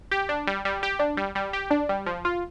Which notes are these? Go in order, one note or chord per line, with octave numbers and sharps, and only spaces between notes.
G4
D4
G3
G3
G4
D4
G3
G3
G4
D4
G3
F3
F4